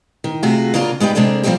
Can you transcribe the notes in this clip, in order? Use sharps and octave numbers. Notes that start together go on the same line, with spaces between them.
D#3
C3 A3 F4 F#4 G#4
C#3 A#3 D4 F4 A#4
G#3 B3 D#4 G4 D5
C3 G#3 A#3 D4 A4
F3 G3 G#3 A#3 C4 G4